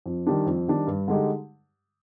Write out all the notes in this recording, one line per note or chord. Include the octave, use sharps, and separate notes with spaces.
F2
D#3 G3 D4
F2
D#3 G3 D4
G2
D3 G#3 D#4 G4